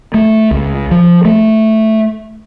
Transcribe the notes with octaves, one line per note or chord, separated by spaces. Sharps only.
A3
C#2
F3
A3